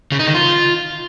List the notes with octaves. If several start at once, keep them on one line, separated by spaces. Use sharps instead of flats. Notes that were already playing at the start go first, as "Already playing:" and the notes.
C#3
D#4
D#3
F4